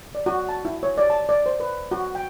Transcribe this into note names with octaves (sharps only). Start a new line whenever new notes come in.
D5
F#4
A5
E4
C#5
D5
A5
D5
C5
B4
F#4
G5